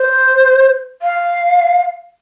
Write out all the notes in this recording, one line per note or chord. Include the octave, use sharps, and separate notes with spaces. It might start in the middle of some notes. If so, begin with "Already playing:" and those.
Already playing: C5
F5